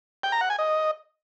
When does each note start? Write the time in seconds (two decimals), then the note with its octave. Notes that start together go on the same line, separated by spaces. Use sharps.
0.23 G5
0.32 A#5
0.41 F#5
0.50 G#5
0.59 D#5